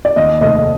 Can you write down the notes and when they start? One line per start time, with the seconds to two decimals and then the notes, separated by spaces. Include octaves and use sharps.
0.05 D5
0.16 D#2 D#5
0.41 F1 D#5
0.55 D#5